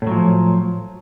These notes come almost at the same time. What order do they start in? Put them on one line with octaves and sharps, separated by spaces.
A2 F#3 F3